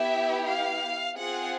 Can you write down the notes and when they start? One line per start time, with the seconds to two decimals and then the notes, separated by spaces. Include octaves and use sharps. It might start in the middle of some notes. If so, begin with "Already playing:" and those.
Already playing: B3 E4 G4 E5
0.47 F5
1.16 C4 F4 G#4 F#5